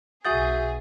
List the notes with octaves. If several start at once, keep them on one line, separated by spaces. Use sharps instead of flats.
B1 F#4 G#4 E5 F#5 D#6 G6 A6